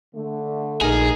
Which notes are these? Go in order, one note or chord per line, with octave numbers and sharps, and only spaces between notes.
D3 A3
A#1 D#4 G#4 A#4